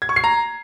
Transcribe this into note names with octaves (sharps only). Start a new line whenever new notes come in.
G#6
C#6
C7
A#5